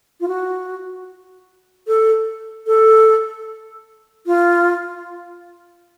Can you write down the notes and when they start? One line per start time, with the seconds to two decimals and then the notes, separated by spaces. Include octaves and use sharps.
0.21 F4
0.28 F#4
1.87 A4
2.67 A4
4.26 F4